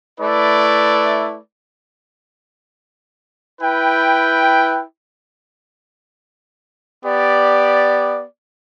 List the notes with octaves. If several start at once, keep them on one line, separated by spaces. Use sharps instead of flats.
A3 E4 B4 D5
E4 B4 G5
B3 G4 D5